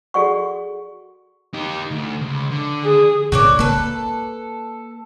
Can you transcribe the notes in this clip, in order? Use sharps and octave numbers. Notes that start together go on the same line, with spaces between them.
F#4 G#4 A4 D5 F#5 C#6
D#4 G4
D2
C#2
D3
G#4
A2 C#3 F#4 C#5 D5
A#3 A4 B4